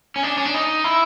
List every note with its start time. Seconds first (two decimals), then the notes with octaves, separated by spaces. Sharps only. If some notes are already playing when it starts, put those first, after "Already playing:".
0.16 C#4
0.23 D4
0.37 C#4
0.45 D4
0.54 D#4
0.84 E4